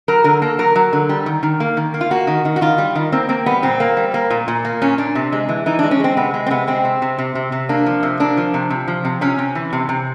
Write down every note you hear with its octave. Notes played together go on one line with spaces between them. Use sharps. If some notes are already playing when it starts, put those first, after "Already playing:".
F#3 A#4
D3 A#4
A#3 A4
F#3 A#4
F#3
D3
G3
D#3
D#3
A#3
D#3
A#3
F4
A#3 F#4
D#3
D#3
F#4
D#3 F4
G3
D#3
A#3 C4
A#3 C4
G3 B3
A#2 C4
A#3
G3
A#3
A#2
A#2
A#3
A#2 C#4
A#2 D4
C3
G#3
E3
E3 D#4
D4
G#3
C#4
G#3 C4
C3 B3
G#3
C4
C3 B3
G#3 C4
C3
C3
C3
C3
C3
A#3 D4
F3
C3
A#3 D4
F3
C3
C3
F3
C3
C3 C#4
C3
E3
C3
C3